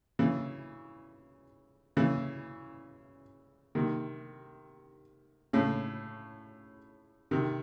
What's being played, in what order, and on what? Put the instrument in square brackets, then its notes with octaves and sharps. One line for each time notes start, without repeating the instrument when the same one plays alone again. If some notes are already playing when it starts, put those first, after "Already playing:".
[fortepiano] C#3 E3
C#3 E3
C3 D#3
A2 C#3
C3 D#3